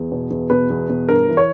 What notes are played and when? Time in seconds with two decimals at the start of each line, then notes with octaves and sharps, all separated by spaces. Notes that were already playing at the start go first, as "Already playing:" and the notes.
Already playing: E2
0.12 B2
0.30 E2
0.50 B2 B4
0.70 E2
0.90 B2
1.09 G2 A#4
1.28 E3
1.37 C#5